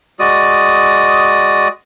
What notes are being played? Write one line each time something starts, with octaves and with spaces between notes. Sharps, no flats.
G#3 F#4 D5 D#6